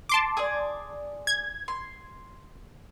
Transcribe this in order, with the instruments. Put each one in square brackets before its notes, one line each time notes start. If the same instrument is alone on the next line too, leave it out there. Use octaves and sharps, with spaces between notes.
[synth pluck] A5 C6 D6
[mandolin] G#4 D5
[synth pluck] G#6
[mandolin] C6